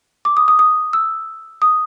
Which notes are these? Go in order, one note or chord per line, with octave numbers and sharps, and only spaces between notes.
D6
D#6
D#6
D#6
E6
D#6